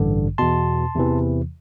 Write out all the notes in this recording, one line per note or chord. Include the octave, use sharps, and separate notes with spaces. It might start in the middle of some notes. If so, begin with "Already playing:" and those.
Already playing: A1 G2 D3
E2 B2 A5 C6
E2 C3 E3